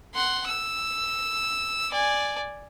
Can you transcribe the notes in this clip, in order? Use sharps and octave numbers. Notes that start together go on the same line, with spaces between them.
F#5 C6
E6
D5 G#5